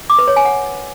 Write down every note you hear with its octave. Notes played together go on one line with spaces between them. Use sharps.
D6
B4
C#5
G#5
F#5